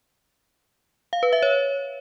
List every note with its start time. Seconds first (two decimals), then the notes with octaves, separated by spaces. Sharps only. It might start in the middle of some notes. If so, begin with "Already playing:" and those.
1.13 F5
1.23 B4
1.33 E5
1.43 C#5